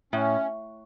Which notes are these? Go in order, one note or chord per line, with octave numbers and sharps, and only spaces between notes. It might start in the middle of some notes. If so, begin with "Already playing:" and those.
A2 C#4